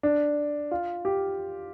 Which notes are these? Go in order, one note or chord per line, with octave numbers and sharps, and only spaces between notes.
D4
F4
G4